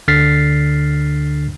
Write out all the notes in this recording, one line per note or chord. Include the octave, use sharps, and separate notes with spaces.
D2 D3 F6 A6 B6 C7